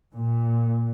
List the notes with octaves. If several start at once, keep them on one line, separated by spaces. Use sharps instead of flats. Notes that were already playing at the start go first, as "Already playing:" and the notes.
A#2